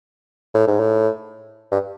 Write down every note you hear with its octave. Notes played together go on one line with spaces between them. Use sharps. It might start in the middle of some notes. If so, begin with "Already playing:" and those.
A2
G#2
A2
G2